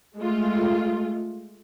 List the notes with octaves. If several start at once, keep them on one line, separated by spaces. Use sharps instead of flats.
G#3 A3 F4